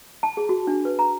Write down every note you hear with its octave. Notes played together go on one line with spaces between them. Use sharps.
A5
G#4
F#4
D4
B4
A#5